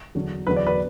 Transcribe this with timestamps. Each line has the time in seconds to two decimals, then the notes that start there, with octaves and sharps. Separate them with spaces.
0.15 E2 D3 F#3
0.46 E2 D3 F#3 B4
0.56 D5
0.67 B4